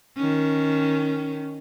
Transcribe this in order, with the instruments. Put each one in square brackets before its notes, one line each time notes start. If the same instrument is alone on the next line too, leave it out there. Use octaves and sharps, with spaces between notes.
[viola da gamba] D#3 C#4